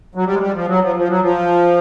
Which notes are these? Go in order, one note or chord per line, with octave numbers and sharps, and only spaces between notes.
F#3
G3
G#3
G3
F3
F#3
F3
F3
F#3
F3